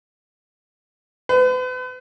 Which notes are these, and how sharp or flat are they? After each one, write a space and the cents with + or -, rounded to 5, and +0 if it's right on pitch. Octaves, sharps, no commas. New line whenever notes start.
B4 +40